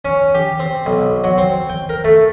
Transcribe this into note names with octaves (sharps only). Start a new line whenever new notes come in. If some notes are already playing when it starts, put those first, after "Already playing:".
C#4
G4
C4
B1
F#3
C4
G5
A#4
A3